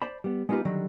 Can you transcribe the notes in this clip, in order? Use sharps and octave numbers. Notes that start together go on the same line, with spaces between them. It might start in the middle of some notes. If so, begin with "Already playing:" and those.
C5 D5 A5 B5
G3 B3
G#3 B3 D#4 F4 G4 B4
D3 D#3 F#3 G3